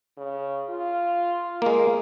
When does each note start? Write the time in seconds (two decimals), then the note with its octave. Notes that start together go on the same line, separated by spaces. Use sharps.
0.17 C#3
0.69 F4
1.62 G#3 A#3